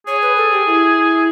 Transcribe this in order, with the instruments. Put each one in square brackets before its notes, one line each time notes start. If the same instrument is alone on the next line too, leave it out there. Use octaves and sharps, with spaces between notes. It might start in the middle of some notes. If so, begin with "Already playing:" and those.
[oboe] G#4 [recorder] C#5
[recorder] B4
A4
G4
E4